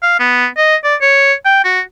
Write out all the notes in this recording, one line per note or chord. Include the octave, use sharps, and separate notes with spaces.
F5
B3
D#5
D5
C#5
G5
F#4